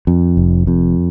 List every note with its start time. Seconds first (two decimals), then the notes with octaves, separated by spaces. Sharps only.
0.07 F2
0.37 F1
0.67 F2